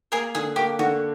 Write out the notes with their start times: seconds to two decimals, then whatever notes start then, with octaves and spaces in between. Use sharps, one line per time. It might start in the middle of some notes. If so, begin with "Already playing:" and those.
0.12 A#3 G#4 A#4
0.35 D3 G#4
0.56 A#3 G4
0.79 D3 F#4